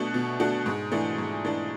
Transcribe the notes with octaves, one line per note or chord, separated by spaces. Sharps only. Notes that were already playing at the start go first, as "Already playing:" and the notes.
Already playing: B2 A3 D4 F#4
B2
A3 D4 F#4
G#2
E3 A3 D4
G#2
E3 A3 D4